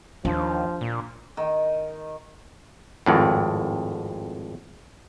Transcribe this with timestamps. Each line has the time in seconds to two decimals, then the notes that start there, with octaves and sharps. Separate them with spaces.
0.25 D#2 F3 D4
0.81 A#2
1.37 D#3
3.06 G#1 F2 A2